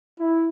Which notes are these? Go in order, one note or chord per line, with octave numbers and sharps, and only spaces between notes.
E4